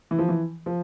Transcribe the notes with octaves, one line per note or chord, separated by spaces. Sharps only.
E3
F3
E3
F3